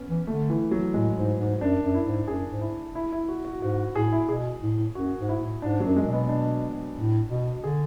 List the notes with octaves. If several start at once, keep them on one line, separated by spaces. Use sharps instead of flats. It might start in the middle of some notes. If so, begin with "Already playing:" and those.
Already playing: B3 C#4
E3
D3 A3
E3
F#3
A2 G#3
G#2
G#2
F#2 D4
F#2
E4
G#2
F#2 G#4
G#2
E4
E4
E4
F#4
F#4
G#2 F#4
A2 G#4
E4
B2 G#4
A2
F#2 F#4
G#2
E4
A2
G#2 D4
F#3
F#2
G#3
B2
B3
D4
A2
B2
D3 G#4